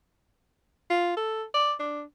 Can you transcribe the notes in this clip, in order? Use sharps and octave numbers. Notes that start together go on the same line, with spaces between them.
F4
A4
D5
D4